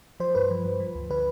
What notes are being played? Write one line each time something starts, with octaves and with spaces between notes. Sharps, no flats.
F3 C5
G2 B4
F3
G2
F3
D2
D3 B4